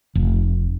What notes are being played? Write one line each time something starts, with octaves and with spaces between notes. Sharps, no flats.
F1